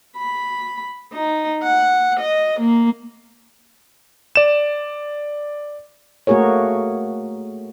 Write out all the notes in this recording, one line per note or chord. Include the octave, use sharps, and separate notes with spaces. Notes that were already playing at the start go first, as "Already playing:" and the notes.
B5
D#4
F#5
D#5
A#3
D5 E7
A3 A#3 F#4 G#4 A#4 C#5